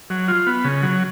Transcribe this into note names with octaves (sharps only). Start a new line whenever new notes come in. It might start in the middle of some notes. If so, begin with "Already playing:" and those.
F#3
F4
B3
C#3
F#3